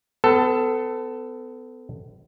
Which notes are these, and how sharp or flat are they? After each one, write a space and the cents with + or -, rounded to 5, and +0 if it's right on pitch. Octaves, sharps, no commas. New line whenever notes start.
B3 +40 A4 +10